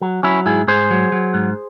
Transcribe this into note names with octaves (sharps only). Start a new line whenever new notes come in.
F#3
F#3 C#4 E4
G#2 E4 G#4
G#2 G#4 C5
F#3
F#3
G#2